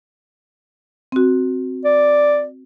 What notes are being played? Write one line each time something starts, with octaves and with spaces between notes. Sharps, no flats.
C4 F#4
D5